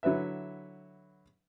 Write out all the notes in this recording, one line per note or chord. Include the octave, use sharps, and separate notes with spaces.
D3 F#3 E4 B4 E5